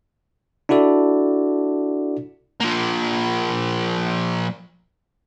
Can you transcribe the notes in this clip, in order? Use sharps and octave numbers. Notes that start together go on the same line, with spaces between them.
D4 E4 F#4 A4 D5
F3 A#3